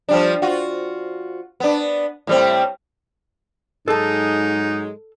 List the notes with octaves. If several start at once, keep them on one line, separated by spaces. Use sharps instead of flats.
F3 G3 D4
F4 F#4
B3 D4
A2 G3 C4
G#2 F#3 G#3 D#4 A4 A5